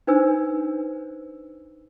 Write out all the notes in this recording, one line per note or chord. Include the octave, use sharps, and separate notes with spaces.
D4 D#4 B4 C5 G#5 E6